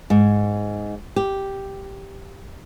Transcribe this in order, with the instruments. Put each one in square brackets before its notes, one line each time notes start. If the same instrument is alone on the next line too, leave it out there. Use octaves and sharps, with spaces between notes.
[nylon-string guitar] G#2
G4